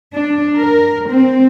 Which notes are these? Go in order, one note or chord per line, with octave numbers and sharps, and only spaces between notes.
D4
A#4
C4